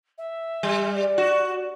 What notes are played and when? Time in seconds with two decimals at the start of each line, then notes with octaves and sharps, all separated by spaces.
0.18 E5
0.63 G3
0.94 D5
1.18 F#4